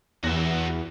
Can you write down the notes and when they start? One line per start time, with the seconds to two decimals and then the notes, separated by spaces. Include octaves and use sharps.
0.24 E2 F#4 E5